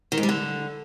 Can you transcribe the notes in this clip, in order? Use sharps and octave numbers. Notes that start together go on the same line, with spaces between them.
D#3
G#2
G3
D3